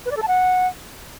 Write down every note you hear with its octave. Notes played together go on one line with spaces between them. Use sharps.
B4
D5
A4
A5
F#5